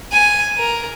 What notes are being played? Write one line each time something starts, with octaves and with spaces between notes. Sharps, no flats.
G#5
A#4